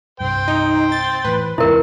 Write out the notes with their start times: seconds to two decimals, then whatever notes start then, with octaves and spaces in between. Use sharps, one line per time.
0.20 C2 G2 C5 G5
0.48 D#4
0.92 A6
1.24 A2 E3 B4
1.58 E2 G#2 C3 E4 A#4